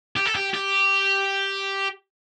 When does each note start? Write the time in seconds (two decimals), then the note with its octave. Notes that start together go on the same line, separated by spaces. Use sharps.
0.17 G4
0.26 A4
0.36 G4
0.54 G4